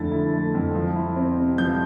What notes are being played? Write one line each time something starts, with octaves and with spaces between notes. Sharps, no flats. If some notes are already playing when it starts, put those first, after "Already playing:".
Already playing: F2 D3 A3 E4 A6
E4
A3
F2
F3
E4
C4
C3
F3 G6